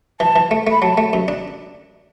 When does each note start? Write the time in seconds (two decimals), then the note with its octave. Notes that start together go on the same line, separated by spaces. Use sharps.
0.20 E3 A5
0.36 E3
0.51 A3
0.67 A3 B5
0.82 F#3 A5
0.97 A3
1.13 F#2
1.28 D4